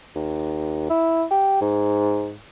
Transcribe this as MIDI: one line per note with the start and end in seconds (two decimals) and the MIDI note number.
0.15 0.90 39
0.90 1.24 64
1.31 1.60 67
1.61 2.35 44